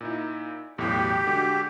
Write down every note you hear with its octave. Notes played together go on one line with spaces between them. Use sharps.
A#2 D#4 E4
B1 E2 A2 G4
D3 G#3 F#4